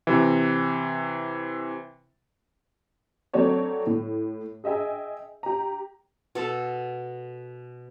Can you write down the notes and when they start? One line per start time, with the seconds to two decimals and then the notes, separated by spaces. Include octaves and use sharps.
0.07 C3 E3
3.33 F#3 A3 C4 F#4 C#5 D5
3.87 A2
4.64 G#4 D#5 E5 G5 G#5
5.43 G4 A#5
6.35 B2 A4 A5